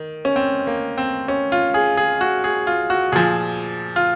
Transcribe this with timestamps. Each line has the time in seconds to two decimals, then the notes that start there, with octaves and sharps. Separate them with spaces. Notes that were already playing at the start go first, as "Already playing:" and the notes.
Already playing: D#3
0.25 C#4
0.36 C4
0.67 A#3
0.98 C4
1.28 C#4
1.52 F4
1.74 G#4
1.97 G#4
2.21 F#4
2.44 G#4
2.67 F4
2.90 F#4
3.12 A#2 F3 G#4
3.96 F4